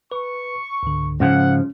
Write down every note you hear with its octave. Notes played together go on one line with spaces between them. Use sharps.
B4 C#6
C#2 G#2 D3
G#2 C#3 F3 C#4 F#5